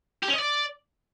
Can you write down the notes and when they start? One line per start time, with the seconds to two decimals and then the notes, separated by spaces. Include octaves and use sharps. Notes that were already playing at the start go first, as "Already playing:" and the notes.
0.23 G4
0.28 C#4
0.34 D#5
0.39 D5